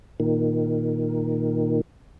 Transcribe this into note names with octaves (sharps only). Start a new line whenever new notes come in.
A#2 D#3